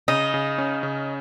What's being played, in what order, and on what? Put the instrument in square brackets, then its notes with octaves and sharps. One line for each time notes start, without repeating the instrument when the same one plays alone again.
[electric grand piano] C#3 [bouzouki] D#4
[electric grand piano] C#3
C#4
C#3